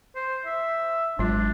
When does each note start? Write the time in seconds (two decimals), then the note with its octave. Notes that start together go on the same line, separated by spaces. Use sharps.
0.15 C5
0.46 E5
1.19 G#1 F#3 G#3 D4 F4